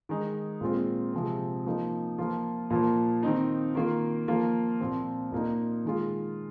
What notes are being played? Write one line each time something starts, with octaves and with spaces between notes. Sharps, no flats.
D#3 G#3 D#4
A#2 G#3 C4 F4
C3 F3 G#3 C4
F3 A#3 D#4
F3 A#3 F4
A#2 F3 A#3
D#3 C4 D#4
D#3 A#3 F4
F3 A#3 F4
A#2 F3 C4
A#2 A#3 D#4
D#3 G#3 F4